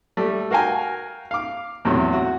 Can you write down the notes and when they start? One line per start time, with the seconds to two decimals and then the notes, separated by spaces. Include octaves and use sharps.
0.17 G3 A3
0.51 F#4 A#4 F5 G5 G#5
1.31 F5 D6
1.85 E2 A2 C3 F#3
2.13 F#4